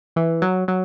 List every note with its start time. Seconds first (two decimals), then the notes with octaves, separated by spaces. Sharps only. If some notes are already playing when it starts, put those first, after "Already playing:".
0.16 E3
0.42 F#3
0.68 F#3